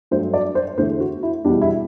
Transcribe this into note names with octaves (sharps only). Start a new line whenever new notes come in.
G2 F#3 A3 C5
D5
C5
E2 D3 A3 C5
F#4
E4
E2 B2 G3 D4
E4